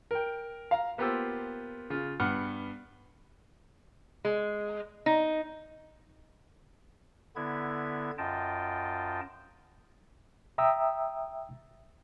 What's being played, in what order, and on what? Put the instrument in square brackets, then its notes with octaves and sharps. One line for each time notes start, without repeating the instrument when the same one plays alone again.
[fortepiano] A#4 G5
F5 A#5
A#3 B3 F4 G4 C5 E6
C#3 F4
G2 B3 F#5 F6
[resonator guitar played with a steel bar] G#3
D#4
[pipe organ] D3 B3 E4 G#6
F#2 F4 D#5 G5 A5
[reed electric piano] E5 G5 A#5 D#6 E6